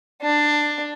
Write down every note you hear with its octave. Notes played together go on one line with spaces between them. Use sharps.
D4